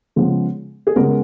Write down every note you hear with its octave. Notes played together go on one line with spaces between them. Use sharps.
C#3 F3 G#3 B3
G#4
C#3 G#3 B3 A#4